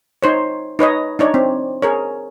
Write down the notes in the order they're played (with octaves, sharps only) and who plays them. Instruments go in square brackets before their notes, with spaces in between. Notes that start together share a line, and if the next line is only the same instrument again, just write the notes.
[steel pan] D#4 C5 C#5
D#4 B4 C#5 D#5
D4 D#4 C#5 D5
C4
G#4 A#4 C#5